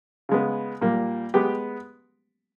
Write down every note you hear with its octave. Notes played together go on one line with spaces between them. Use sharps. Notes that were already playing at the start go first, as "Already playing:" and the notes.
C#3 G#3 B3
A#2 G3 A#3
G#3 B3 G4